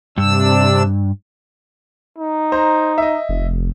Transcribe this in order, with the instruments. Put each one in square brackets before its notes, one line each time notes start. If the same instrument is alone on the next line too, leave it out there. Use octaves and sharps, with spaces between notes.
[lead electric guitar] G2 [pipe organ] C3 D4 E6
[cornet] D#4
[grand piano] C5 A#5
D#5 E5
[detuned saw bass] F1